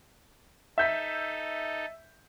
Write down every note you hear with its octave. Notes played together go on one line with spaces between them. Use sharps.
D#4 A4 E5 G6 B6